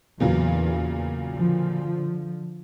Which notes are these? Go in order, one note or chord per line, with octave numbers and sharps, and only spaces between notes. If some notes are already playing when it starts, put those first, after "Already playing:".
E2 A#2 C#3 F#3
D3 F3